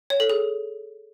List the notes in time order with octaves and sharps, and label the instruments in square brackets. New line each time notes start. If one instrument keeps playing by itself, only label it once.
[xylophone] C#5
A4
G#4